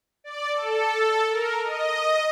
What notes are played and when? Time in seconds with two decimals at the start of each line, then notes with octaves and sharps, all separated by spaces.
0.24 D5
0.54 A4
0.98 A4
1.30 A#4
1.64 D#5